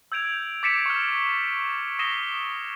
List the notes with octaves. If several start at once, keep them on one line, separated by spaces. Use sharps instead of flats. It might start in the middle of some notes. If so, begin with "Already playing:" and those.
E6 G6 G#6 D7 F7
D6 A6 B6 C#7 D7 E7
C#6 F6
D#6 A#6 C7 D#7 E7 G7